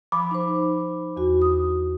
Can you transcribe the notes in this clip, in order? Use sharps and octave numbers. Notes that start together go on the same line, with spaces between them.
F3 B5 D6
D#4 C5
E2 F#4
D#6